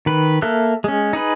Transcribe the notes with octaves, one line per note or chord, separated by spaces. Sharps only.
D#3 B4
A#3 A4 A#4 E5 F#6
G#3 C#4
D#4 G#4 B4